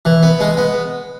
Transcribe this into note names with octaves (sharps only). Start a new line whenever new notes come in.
E3
B3
G#3
B3